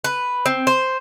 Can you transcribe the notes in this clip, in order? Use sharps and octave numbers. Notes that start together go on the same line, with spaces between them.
B4
C4
C5